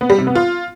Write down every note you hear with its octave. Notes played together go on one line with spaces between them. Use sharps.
B3
G3
C3
B3
F4